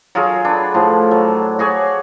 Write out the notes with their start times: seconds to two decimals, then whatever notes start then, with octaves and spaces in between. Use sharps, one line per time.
0.15 F#3 F4 G#4 A#4
0.45 D4 B4
0.74 A2 F3
1.11 F#3
1.59 F#4 G#4 C#5 D5